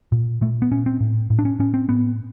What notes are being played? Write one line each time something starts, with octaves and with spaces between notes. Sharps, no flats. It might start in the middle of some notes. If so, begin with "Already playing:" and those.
A#2
A#2 A3
B3
A#2 C#4
C4
A2
A2
D4
C#4
A2 C#4
C4
A2 B3